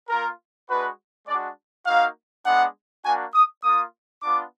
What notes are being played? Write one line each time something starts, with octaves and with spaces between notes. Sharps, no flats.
A#3 F4 A#4
G#3 D4 F#4 B4
G#3 D4 F#4 D5
A#3 D#4 F#4 F5
G#3 B3 D4 F#5
A#3 D4 F#4 G#5
D#6
A#3 F4 D#6
B3 D4 F4 D6